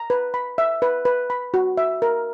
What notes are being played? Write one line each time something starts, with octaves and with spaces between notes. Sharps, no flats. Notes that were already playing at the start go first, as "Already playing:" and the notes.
Already playing: A#5
B4
B5
E5
B4
B4
B5
F#4
E5
A#4